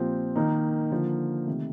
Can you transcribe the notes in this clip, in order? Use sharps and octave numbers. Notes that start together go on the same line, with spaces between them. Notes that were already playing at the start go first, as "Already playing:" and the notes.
Already playing: A#2 F3 C4 G4
D#3 A#3 D#4
D3 F3 A#3
C3 D#3 A3